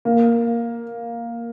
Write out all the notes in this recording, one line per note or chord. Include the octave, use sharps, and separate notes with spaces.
A#3